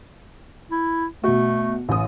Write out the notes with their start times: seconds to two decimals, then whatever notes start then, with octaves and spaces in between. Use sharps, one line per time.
0.71 E4
1.24 B2 A3 F#4
1.89 A1 E3 D#6